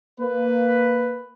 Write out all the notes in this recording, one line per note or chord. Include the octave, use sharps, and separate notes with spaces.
A#3 B4